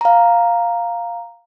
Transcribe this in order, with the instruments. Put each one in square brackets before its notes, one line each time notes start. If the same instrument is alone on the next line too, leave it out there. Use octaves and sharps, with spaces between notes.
[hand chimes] F5 A#5